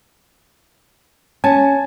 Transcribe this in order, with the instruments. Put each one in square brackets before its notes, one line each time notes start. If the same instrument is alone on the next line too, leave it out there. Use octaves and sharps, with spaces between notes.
[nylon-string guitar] C#4 [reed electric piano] G#5 A5